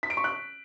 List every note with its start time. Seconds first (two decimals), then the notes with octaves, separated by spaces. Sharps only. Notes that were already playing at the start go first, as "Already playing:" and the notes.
0.03 B6
0.10 D7
0.17 C#6
0.24 F#6